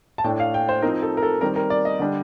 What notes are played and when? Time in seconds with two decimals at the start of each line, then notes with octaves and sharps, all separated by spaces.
0.18 A5
0.24 A2 A3 D4 G5
0.40 F5
0.54 G5
0.69 C5
0.82 F3 C4 D#4 A#4
1.03 A4
1.17 A#4
1.23 A4
1.41 D#3 G3 C4 A#4
1.56 A#4
1.70 D5
1.85 D#5
1.99 D3 G3 D4